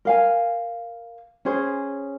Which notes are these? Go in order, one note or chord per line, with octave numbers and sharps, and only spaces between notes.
A#4 F5 G#5
C#4 G#4 C5